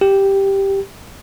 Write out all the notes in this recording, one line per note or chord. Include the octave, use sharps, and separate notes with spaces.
G4